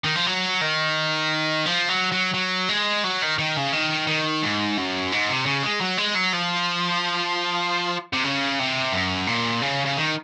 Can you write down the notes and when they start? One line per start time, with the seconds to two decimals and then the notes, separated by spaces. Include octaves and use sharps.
0.04 D#3
0.16 F3
0.27 F#3
0.61 D#3
1.66 F3
1.89 F#3
2.12 F#3
2.34 F#3
2.69 G#3
3.04 F#3
3.22 D#3
3.39 D#3
3.56 C#3
3.72 D#3
4.07 D#3
4.43 G#2
4.78 F#2
5.12 G#2
5.29 C3
5.46 C#3
5.63 G#3
5.81 F#3
5.98 G#3
6.15 F#3
6.33 F3
8.13 C3
8.24 C#3
8.59 C3
8.93 F#2
9.27 A#2
9.62 C#3
9.86 C#3
9.97 D#3